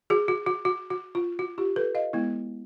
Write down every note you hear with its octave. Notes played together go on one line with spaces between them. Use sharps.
F#4 G#4
F#4
F#4
F#4
F#4
F4
F#4
F4 G4
A4 B4
D#5 F5
G#3 B3 E4